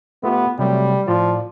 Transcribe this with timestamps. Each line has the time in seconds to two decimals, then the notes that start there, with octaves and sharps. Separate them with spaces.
0.23 A3 B3 F4 G4
0.59 C3 F#3 G3 A3
1.08 A2 F3 F4 D5